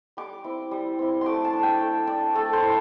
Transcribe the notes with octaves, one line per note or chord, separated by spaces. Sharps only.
G3 D6
C4 E4
G3
C4 E4
A3 C6 D6
A5
D4
G5
A3
D4 D5
A3 A4
C5
E4